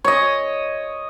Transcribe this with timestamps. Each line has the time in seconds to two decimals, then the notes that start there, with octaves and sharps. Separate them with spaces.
0.05 C#5 D#5